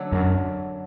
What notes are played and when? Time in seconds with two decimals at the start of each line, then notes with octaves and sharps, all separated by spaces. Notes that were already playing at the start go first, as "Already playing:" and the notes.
Already playing: D3 F#3 A3
0.12 F#2